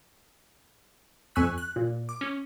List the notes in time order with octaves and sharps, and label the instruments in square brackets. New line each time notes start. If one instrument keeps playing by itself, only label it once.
[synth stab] F2 G#5 C#6 E6 F#6 B6
F#6
A#2
D6
C#4